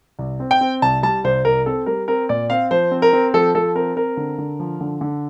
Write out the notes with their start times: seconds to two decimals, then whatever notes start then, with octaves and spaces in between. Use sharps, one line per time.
0.19 C2
0.40 C4
0.51 G5
0.61 C4
0.82 C2 A5
1.03 G3 A5
1.24 C2 C5
1.45 C2 A#4
1.66 C4 A4
1.86 G3 A#4
2.08 C4 A#4
2.29 A#2 D5
2.50 C4 F5
2.71 F3 C5
2.91 C4
3.02 A#4
3.13 C4
3.34 F3 A4
3.55 F3 A4
3.75 C4 A#4
3.96 C4 A#4
4.17 D3
4.38 D3
4.60 F3
4.81 D3
5.01 D3